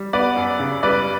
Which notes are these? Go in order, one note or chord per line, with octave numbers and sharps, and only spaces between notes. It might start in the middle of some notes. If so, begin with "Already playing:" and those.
Already playing: G3
B3 B4 D5
F#2
C#3
G3 B4 D5